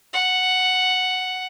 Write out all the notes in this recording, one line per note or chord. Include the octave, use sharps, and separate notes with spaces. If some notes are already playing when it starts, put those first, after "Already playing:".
F#5